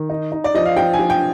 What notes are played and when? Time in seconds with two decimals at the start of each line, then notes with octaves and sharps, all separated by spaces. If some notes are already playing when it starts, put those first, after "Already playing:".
Already playing: D#3
0.10 D#4
0.32 D#4
0.44 D5
0.55 F3 D#5
0.66 F5
0.76 F3 G5
0.93 G#5
0.99 F3
1.10 G5